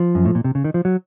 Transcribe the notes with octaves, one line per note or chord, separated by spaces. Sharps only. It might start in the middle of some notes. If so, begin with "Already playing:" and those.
Already playing: F3
F#2
A2
A#2
C3
C#3
D#3
F3
F#3